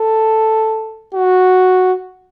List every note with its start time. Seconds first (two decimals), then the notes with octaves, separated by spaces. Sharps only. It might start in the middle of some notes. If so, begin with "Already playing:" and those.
Already playing: A4
1.14 F#4